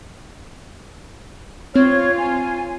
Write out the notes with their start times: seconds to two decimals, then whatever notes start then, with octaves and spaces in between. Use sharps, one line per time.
1.74 C4 F4 C#5 F6
2.18 G#5